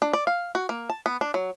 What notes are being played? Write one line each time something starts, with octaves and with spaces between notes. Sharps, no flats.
D4
D5
F5
F#4
A#3
A5
B3
D4
F#3